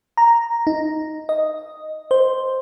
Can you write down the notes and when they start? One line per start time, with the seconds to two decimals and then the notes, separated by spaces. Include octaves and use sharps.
0.17 A#5
0.67 D#4
1.29 D#5
2.11 C5